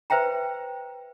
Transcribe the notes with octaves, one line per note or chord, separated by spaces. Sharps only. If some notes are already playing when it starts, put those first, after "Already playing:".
B4 C5 E5 G5 A#5